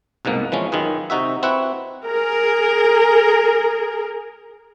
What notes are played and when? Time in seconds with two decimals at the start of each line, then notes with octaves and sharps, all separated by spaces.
0.25 C2 G#2 B2 A#3
0.52 E3 F3 G#3 C#4
0.72 F#2 D#3 F4 G#4 B4
1.10 C3 D#4 F#4 E5
1.43 C4 E4 F#4 B4 F#5
2.06 G#4 A#4